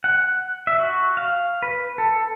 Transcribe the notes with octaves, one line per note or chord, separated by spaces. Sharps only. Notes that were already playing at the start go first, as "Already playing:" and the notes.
F#5
E5
F#4
F5
B4
A4